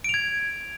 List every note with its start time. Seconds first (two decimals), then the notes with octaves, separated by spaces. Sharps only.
0.04 D7
0.09 F7
0.14 G#6